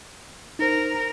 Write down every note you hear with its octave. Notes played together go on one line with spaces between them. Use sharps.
D#4 A#4 C5